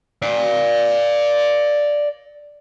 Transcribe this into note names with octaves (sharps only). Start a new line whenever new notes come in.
D5 F5